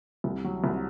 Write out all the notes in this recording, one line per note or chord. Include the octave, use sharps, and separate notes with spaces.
C2
F#3
C2